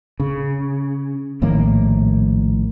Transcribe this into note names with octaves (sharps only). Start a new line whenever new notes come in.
C#3
A#1 A2 D#3 A#3